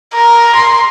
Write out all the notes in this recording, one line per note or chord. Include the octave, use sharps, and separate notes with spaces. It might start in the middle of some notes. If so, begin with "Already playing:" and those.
A#4
C6